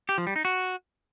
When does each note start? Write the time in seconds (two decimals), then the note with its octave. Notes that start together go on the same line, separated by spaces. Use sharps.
0.09 G4
0.18 F3
0.27 G3
0.36 D#4
0.45 F#4